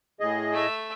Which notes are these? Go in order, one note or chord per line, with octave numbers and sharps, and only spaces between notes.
A2 G#4 D#5
A3 E5